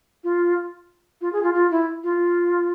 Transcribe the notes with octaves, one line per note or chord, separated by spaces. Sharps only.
F4
F4
G#4
F4
F4
E4
F4